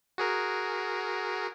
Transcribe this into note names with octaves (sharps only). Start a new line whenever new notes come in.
F#4 G#4 A#4